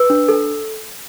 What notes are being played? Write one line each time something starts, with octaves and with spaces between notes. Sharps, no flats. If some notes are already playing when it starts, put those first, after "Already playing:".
Already playing: B4 E6
D4
A4